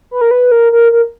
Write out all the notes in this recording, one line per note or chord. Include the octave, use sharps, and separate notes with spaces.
B4
A#4
B4
A#4
A#4
A#4